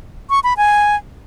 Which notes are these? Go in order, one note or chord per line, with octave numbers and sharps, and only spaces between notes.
C#6
B5
G#5